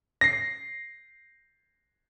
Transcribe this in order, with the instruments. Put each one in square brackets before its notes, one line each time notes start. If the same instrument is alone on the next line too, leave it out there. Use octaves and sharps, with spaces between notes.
[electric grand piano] A#6 C7